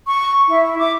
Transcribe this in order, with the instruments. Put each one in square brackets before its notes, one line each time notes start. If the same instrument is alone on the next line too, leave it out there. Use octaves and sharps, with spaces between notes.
[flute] C#6
E4
D6